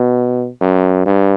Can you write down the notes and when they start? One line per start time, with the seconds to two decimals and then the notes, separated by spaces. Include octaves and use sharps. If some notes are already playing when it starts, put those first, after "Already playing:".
Already playing: B2
0.61 F#2
1.06 G2